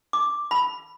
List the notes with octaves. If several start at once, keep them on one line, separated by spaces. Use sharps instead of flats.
D6
B5